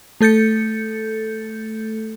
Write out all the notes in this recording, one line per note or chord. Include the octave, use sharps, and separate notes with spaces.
A3 A4 G6 A6 C#7